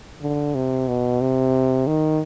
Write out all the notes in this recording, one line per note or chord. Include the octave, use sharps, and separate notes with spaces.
D3
C3
B2
C3
D#3